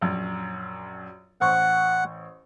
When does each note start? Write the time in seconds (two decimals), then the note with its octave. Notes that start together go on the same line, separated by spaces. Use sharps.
0.01 A#1 F#2
1.41 A1 C5 F#5 C#6